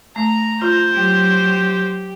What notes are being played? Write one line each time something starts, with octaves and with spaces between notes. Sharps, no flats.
A3 A#5
F4 C5
F#3 G4